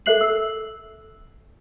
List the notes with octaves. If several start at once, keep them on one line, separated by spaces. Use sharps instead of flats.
A4 A#4 E5 F#6 C7 F#7
E6